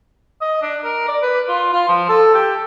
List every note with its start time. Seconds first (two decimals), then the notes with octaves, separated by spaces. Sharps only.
0.41 D#5
0.62 D4
0.84 A#4
1.08 D5
1.22 B4
1.48 F4
1.72 F4
1.88 F3
2.09 A4
2.34 G4